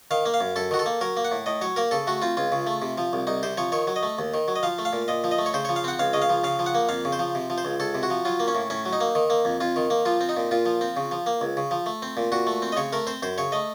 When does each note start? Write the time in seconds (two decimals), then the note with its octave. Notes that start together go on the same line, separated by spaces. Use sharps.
0.11 D#3 F5
0.26 A#3
0.34 F5
0.41 F#2
0.56 F#2 A4
0.71 D#3 F#4
0.79 A4
0.86 A#3
1.01 F#3 A#4
1.17 A#3
1.25 F#5
1.32 A2
1.46 A2 D#5
1.61 F#3 C#5
1.76 A#3 A#4
1.91 C#3 A4
2.07 A3 F#4
2.22 C4 F4
2.37 C#2 F4
2.52 C#3
2.67 A3
2.82 C3
2.98 F3
3.13 C2
3.27 C2 D#4
3.43 C3 C5
3.57 F3 C#5
3.72 D#3 C#5
3.87 F#3
3.96 D#5
4.03 A3
4.19 D#2
4.34 D#3
4.48 F#3
4.56 D#5
4.63 F3 F5
4.79 A3
4.85 F5
4.93 A#2
5.08 A#2 D#5
5.24 F3
5.31 D#5
5.38 A3
5.46 C#5
5.54 C#3 C5
5.65 F3 C#5
5.76 F5
5.84 C4 F#5
5.99 C#2 F5
6.13 C#3 D#5
6.22 F5
6.29 F3
6.44 C#3 F5
6.59 F3
6.66 F#5
6.75 A#3
6.89 F2 F5
7.05 C#3
7.13 C5
7.19 F3
7.35 C3
7.50 F3
7.58 C5
7.65 C#2
7.80 C#2 A4
7.95 C3
8.03 F#4
8.10 F3
8.25 F#3 F4
8.40 A#3
8.48 C#4
8.55 A2
8.70 A2 C#4
8.86 F#3
8.93 D#4
9.00 A#3
9.15 D#3
9.30 A#3
9.45 F2
9.60 F2 F4
9.76 D#3
9.90 A#3
10.05 F3 F4
10.21 C4
10.29 D#4
10.37 A#2
10.51 A#2 F4
10.66 F3
10.81 C4
10.97 C#3
11.11 F3
11.26 A#3
11.41 C#2
11.57 C#3
11.71 F3
11.86 A3
12.02 C4
12.17 A#2
12.32 A#2 F#4
12.47 A3
12.62 C4
12.72 D#5
12.77 C#3 C#5
12.93 A3 A#4
13.07 C4 C5
13.22 F#2 C5
13.38 C#3 C#5
13.52 A3 D#5